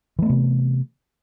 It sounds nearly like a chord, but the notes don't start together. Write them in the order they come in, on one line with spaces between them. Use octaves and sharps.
E3 A3 B3 C3